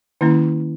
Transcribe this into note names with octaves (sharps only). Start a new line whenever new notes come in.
D#3 A#3 C#4 E4